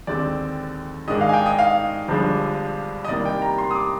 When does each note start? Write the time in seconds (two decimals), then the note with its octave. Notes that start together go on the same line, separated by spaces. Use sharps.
0.07 D#2 D3 G#3 C4 D5
1.08 G#2 D#3 G#3 D4 D#5
1.21 F5
1.29 G#5
1.34 G5
1.46 D#5
1.58 F5
2.08 G1 G2 F3 G#3 D4
3.05 D#5
3.08 C2 C3 D#3 A#3 D5
3.25 G5
3.42 A#5
3.58 C6
3.71 D#6
3.75 D6